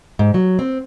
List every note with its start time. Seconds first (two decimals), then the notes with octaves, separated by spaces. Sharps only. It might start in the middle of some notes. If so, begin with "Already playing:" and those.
0.19 G#2
0.34 F#3
0.59 C4